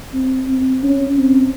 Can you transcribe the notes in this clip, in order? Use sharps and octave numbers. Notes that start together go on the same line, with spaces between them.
C4
C4
C#4
C4